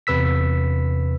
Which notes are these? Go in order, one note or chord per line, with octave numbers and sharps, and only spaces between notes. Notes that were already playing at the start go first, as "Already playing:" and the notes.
E2 C3 B4 E6 B6